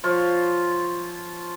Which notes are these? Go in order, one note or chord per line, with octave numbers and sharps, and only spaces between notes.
F3 F4 C#5